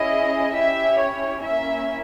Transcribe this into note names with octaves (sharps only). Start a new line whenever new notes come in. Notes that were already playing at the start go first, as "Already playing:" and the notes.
Already playing: C#4 E4 G#4 D#5
C#4 E4 G4 E5
C#5
A#3 C#4 E4 E5